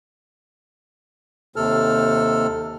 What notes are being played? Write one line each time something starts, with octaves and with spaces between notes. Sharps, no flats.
D#2 C3 A4 F6